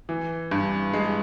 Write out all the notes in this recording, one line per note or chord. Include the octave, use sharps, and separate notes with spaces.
E3
G2
G#3